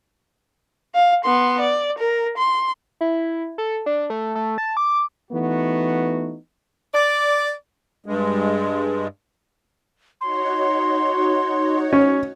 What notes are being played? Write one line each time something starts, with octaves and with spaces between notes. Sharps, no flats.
F5
B3 C6
D5
A#4
C6
E4
A4
D4
A3
A3
A5
D6
E3 A3 B3 D#4 F#4
D5
G2 G#3
D#4 F#4 C#5 C6
C#4